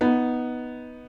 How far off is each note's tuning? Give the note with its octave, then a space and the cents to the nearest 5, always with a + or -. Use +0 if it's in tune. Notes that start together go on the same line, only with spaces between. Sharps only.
B3 +0 D#4 +10